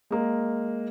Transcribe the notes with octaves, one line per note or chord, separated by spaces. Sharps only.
G#3 A#3